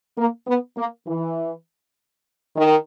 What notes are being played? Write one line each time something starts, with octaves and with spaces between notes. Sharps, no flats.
A#3
B3
A#3
E3
D#3